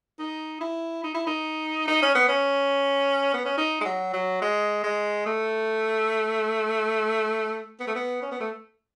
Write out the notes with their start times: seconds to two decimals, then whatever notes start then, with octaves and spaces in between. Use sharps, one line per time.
0.19 D#4
0.61 E4
1.04 D#4
1.15 E4
1.27 D#4
1.88 D#4
2.02 C#4
2.15 B3
2.29 C#4
3.34 B3
3.45 C#4
3.58 D#4
3.81 G#3
3.85 F#3
4.13 F#3
4.42 G#3
4.84 G#3
5.26 A3
7.80 B3
7.87 A3
7.95 B3
8.22 C#4
8.31 B3
8.41 A3